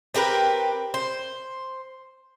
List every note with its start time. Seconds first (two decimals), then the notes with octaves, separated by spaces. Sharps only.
0.14 C4 G4 A#4 B4
0.94 C5